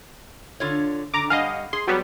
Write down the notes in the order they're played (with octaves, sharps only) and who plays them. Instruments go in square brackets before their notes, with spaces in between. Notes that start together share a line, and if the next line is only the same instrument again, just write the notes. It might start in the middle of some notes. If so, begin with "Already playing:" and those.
[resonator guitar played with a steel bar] D3 F4 C#5
[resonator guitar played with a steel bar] D3 [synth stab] A#5 D6
[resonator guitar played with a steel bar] G2 F#5 G#5 [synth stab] D#5 F5
[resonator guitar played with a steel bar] G#4 [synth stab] C6
[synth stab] F#3 G3 B3